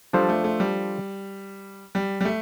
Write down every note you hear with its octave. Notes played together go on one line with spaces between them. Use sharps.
F3 G3 D4 A4 C5
A3
A3
G3
G3
G3
A3